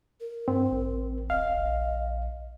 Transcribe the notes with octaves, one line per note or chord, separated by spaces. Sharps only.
A#4
G2 C4
A1
D#1 D#5 F5
A#1